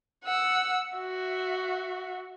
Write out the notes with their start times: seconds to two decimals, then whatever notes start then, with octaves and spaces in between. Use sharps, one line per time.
0.25 F#5 E6
0.96 F#4 E5